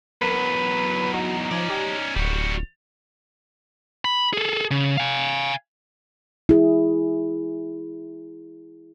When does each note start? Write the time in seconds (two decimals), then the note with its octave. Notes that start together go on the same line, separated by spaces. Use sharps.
0.22 E2 F#3 A#4 B4
1.14 D#4 F#4
1.51 F3 C#4 D5
1.70 G4
2.16 D1 G3 F#4
4.05 B5
4.34 G#4 A4
4.71 C#3
4.97 F5 G#5
6.49 E4 G#4